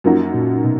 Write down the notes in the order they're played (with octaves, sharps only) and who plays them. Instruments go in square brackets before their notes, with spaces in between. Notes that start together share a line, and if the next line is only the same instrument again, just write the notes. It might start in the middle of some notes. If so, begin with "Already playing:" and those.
[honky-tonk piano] F#2 F3 A#3 D#4 F#4
[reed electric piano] A#2
B2